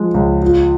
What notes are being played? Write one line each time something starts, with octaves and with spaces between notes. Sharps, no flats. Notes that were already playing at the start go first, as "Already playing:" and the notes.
Already playing: F3 G#3
C#2
F4